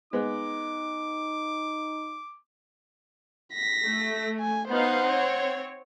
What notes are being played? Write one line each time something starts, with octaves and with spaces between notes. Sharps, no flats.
G#3 B3 D#4 D6
A#6 B6
A3
G#5
B3 D#4 C5 F5 F#5
C4 C#5